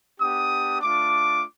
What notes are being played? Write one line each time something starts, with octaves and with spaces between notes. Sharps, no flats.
B3 D4 G4 D#6
A3 D4 F4 D6